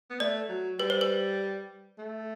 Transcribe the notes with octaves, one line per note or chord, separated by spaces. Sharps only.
B3
A3 D5
F#3
G3 B4
C5
B4
A3